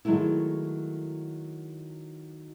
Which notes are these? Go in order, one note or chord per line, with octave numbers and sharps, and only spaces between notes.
D#3 F#3 G#3 A3 E4